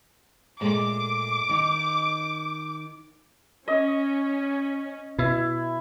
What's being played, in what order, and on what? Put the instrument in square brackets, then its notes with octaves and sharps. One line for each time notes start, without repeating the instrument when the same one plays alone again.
[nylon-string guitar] A#2 G#3 A3 [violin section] D6
[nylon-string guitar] D#3 D#4
[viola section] C#4 [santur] D#5
[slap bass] B2 [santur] E4